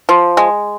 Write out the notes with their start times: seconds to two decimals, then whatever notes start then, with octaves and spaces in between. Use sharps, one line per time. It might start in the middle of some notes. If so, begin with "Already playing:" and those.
0.09 F3
0.37 G#3